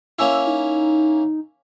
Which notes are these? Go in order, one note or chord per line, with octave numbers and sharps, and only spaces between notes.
A#3 C#4 E4 E6
D#4